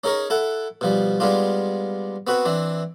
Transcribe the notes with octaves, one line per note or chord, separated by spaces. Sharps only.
C#4 D#4 G#4 A#4 C#5
E4 A4 F#5
B2 F3 G3
G3 G#3 B3 D4 F4
B3 C4 F#4 B4
E3 C4 D4